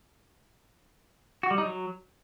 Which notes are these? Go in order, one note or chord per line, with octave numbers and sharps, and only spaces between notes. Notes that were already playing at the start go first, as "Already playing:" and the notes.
F#4
G3
D#4
F#3